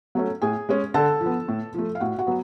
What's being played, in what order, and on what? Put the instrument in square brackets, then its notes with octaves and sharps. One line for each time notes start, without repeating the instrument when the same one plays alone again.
[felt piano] F#3 A3 C#4
A2 G#4 G#5
G#3 C#4
D3 A4 A5
F3
B3
A2
F3 A3
F5
A2 F#4 F#5
F#4 F#5
F#3 B3